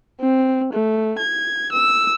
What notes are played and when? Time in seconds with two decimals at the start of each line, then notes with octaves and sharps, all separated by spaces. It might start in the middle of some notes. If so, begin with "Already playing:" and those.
0.20 C4
0.73 A3
1.19 G#6
1.72 E6